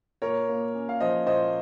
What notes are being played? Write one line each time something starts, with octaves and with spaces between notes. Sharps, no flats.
A#2 A#4 C#5
A#3
C#4
F5
F3 C5 D#5
A#2 C5 D#5